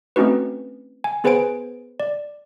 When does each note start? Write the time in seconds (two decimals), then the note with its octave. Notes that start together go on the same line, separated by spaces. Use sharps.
0.16 A3 C4 C#4 D#4 F#4 B4
1.04 G#5
1.24 B3 G#4 B4 C5 G#5 D7
2.00 D5